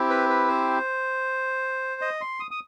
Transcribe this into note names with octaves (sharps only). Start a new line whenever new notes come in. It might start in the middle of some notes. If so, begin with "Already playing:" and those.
Already playing: C4 E4 G4
B4
B4
C5
D#5
C6
D#6
D#6